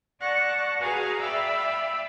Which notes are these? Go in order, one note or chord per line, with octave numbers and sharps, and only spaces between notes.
D5 F#5 A5 C#6 A#6
F#4 G#4 B4 F5 G#5 A#5
D5 E5 F5 G5 B5 E6